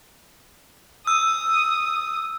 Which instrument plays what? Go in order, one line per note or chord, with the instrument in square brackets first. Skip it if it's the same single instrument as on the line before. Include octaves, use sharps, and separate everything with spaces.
[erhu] D#6 [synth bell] E6